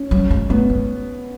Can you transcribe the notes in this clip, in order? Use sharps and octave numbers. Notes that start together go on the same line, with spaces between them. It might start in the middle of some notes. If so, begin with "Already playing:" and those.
Already playing: C#4
F#3
G#3
A3 B3
G#3